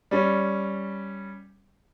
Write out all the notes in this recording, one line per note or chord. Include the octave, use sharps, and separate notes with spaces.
G3 C#4